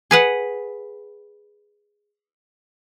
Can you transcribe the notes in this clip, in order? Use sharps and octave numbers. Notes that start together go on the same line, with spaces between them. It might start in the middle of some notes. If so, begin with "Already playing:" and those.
G#4 B4 F#5